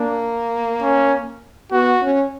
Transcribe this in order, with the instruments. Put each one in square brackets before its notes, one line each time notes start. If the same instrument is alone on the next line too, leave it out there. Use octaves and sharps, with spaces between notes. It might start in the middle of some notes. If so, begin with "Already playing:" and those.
Already playing: [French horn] A#3 [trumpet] D4
[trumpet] C#4
[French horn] B3 [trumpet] F#4
[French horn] C#4